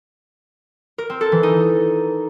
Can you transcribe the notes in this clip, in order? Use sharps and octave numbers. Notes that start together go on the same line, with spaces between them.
A#4
C4
A4
E3
D#4